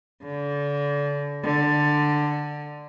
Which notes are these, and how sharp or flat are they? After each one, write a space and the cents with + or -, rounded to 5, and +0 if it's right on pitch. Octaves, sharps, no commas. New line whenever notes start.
D3 -30
D3 +10